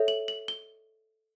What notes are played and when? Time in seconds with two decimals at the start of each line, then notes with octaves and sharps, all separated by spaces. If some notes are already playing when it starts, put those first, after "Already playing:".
Already playing: A4 C#5 E5
0.08 F#7
0.28 F#7
0.48 G7